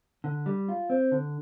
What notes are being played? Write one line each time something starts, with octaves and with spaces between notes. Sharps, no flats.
D3
G3
F4
C4
D3